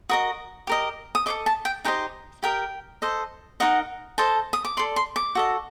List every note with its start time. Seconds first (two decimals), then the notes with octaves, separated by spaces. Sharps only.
0.09 F#4 A#4 D#5 D#6
0.67 G4 A#4 D#5
1.15 D#6
1.26 A4 C5 D#5 D6
1.46 A5
1.65 G5
1.85 D#4 G4 C5 D#5 G5
2.43 G4 A#4 D#5 G5
3.02 A4 C5 D#5
3.60 D#4 F#4 A#4 D#5 F#5
4.18 A4 C5 D#5 A5
4.53 D#6
4.65 D6
4.77 A4 D5 C6
4.96 C6
5.16 D6
5.35 F#4 A4 D#5